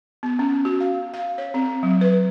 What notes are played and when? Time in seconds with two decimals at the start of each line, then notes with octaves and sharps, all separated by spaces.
0.23 B3
0.39 C#4
0.65 F#4
0.80 F5
1.14 F5
1.38 C#5
1.54 C4
1.83 F#3
2.01 B4